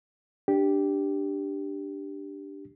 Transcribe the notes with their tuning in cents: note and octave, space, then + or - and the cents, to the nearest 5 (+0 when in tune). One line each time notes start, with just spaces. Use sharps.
D4 +0 G4 +0